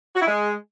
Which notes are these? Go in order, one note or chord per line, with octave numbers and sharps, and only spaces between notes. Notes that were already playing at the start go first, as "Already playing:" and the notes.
F#4
E4
G#3